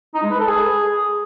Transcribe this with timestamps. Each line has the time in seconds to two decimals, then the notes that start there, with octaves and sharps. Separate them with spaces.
0.14 D#4
0.23 G#3
0.31 B4
0.39 A4
0.47 G#4